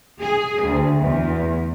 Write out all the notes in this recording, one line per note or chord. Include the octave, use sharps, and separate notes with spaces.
G#4
D2
E2